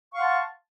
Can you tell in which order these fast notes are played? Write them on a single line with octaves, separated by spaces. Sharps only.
C#6 F5 F#5 C6 A5